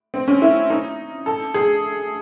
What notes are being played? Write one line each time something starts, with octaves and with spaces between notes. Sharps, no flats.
C4
C#4
E4
D#4
A4
G#4